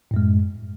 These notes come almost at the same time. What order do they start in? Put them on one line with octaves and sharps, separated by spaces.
A2 F#2 G#3